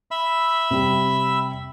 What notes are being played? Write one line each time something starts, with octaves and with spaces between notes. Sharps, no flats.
E5 B5 E6
C3 G3